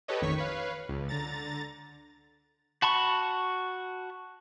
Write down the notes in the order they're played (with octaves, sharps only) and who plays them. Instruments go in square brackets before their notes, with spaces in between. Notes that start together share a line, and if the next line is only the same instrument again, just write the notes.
[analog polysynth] G4 A4 B4 C#5 D#5
A1 F2 D#3 C#5 C#6 B6
B4 C#5 F5
C#2
D3 A#5 A6
[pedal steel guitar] F#4 A5 B5 C#6